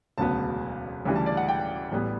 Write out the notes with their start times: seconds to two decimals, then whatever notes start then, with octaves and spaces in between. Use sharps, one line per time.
0.18 E1 D2 C#3 F#3 B3 A5
1.05 D2 C#3 E3 G3
1.16 A5
1.26 D5
1.37 F#5
1.48 G5
1.92 A1 A2 G3 B3